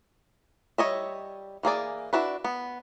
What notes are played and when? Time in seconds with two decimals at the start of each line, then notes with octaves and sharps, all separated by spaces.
0.78 G3 C#5 D#5 E5
1.63 E3 A#3 G#4 D5
2.13 D4 E4 F#4 B4
2.44 B3